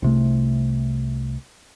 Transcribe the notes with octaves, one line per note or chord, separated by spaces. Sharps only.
C2 C3 A3